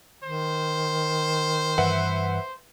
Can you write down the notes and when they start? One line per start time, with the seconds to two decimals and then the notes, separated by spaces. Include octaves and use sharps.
0.23 D#3 C5
1.78 G2 E3 B4 E5 F#5